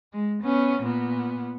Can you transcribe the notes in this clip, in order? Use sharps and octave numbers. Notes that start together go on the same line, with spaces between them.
G#3
B3 C#4
A#2 B3